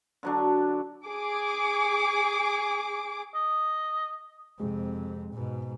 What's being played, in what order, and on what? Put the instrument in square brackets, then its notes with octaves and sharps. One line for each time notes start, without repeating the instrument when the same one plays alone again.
[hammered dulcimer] D3 F#3 D4
[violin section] G#4 D6
[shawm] D#5
[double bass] F2 C3 [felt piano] G#3
[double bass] G#2 B2